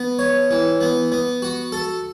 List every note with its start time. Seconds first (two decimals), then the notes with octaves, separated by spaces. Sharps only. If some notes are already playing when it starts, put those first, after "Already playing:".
Already playing: B3
0.19 C#5
0.51 E3
0.81 B3
1.12 B3
1.42 F#4
1.72 A4